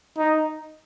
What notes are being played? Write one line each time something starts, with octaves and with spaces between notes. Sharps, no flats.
D#4